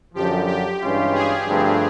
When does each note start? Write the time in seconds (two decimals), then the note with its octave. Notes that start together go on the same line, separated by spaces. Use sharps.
0.14 F#2 D3 F3 G4
0.48 G4
0.81 G2 E3 G#3 C#4 F4
1.14 G#4
1.47 G2 D3 F3 A3 C4